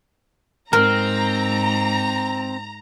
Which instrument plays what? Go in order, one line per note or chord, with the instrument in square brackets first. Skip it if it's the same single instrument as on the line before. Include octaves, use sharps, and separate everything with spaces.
[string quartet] G#2 [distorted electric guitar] C4 [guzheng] A#4 [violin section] A#5